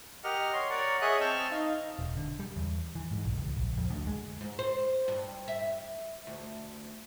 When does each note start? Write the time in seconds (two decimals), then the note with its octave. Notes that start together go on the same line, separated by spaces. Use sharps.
0.24 G4 A#4 D#5 F#5 F6
0.53 C#5 C6
0.70 A#4 C#5 D5 F#5
1.02 G#4 C#5 D#5 E5 D#6 F#6
1.20 C4 A5 C#6 E6 F6 G6
1.51 D#4 F5
1.99 E1
2.17 D3
2.40 G3
2.56 E2
2.95 E3
3.11 G#2
3.25 B1
3.38 C#2
3.57 A#1
3.77 F2
3.90 D2
4.07 G#3
4.41 G#2
4.59 C5
5.08 G2
5.48 E5
6.27 D2